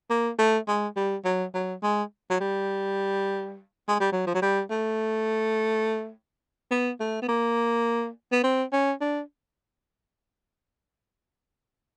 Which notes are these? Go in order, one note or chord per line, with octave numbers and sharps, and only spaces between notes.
A#3
A3
G#3
G3
F#3
F#3
G#3
F#3
G3
G#3
G3
F#3
F3
F#3
G3
A3
B3
A3
B3
A#3
B3
C4
C#4
D4